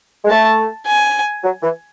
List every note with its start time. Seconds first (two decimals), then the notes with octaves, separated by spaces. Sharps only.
0.25 G#3
0.30 A3 A5
0.87 G#5
1.44 F#3
1.63 E3